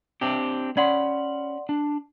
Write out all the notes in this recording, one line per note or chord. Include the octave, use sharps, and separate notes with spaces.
C4 D4 G4
C#4 D5 F#5 B5 C6
D4